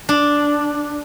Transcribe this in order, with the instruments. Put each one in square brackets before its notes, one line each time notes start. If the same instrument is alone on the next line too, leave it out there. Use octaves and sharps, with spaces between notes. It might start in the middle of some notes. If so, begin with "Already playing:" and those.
[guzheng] D4